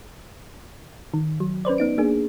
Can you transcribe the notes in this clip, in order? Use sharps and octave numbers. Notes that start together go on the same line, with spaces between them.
D#3
F#3
C#4 B4 C5 D5
B3 D#4 D7
A#3 D4 G#4